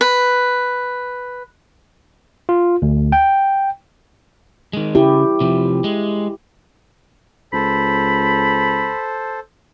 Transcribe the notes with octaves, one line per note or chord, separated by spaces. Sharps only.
B4
F4
D2
G5
D#3 G#3
C#3 E4 G4
C3 F3
G#3
C#2 A4 C5 B5